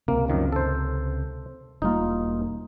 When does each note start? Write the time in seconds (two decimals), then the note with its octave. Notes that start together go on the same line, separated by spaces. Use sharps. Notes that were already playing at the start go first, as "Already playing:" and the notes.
0.08 C#2 C3 A#3
0.28 F#2 D#3 F3
0.52 A4 C5
1.82 E1 G3 A#3 D#4 F4